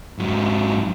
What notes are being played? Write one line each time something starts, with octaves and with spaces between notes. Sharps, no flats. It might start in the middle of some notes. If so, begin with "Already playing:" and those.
G#2 F#3